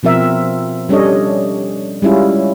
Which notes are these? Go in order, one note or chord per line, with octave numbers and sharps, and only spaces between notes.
B2 F3 C4 A#4 E5
G3 C#4 D4 A4 C#5 D#5
G3 G#3 C#4 E4 F4